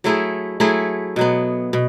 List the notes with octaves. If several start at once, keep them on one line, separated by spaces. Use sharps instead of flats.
F#3 A3 E4 G#4
F#3 A3 E4 G#4
B2 F#3 B3
B2